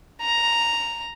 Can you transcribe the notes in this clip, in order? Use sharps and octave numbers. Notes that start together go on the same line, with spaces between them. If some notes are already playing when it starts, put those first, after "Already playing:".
A#5